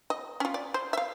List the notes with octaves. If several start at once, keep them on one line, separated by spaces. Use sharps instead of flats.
D#5
C#4 F4
D5
C5
E5 F5